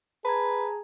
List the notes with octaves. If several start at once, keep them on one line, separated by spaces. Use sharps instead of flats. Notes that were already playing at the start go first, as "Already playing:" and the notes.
G#4 B4 A5 A#5 G#6